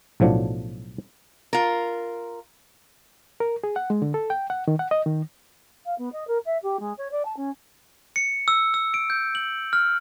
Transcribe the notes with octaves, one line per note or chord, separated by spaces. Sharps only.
B1 A2 F3 F#3 D4
F4 A#4
A#4
G#4
F#5
G#3
D3
A4
G5
F#5
D#3
F#5
D#5
D#3
F5
B3
D#5
A#4
E5
G4
G#3
C#5
D5
A5
C#4
C#7
E6
E6
D7
G6
F#7
F6